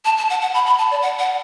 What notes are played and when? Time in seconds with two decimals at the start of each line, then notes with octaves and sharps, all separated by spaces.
0.05 A5
0.18 A5
0.30 F#5
0.42 F#5
0.54 B5
0.66 B5
0.78 A5
0.91 D5
1.02 F#5
1.19 F#5